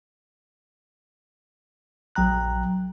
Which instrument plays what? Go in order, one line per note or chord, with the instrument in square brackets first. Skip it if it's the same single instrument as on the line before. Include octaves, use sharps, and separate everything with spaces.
[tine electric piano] A#1 F#3 G5 A#5 F#6